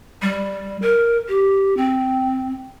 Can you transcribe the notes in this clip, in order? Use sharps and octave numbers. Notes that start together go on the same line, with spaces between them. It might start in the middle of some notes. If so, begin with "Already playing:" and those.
G3
A#4
G4
C4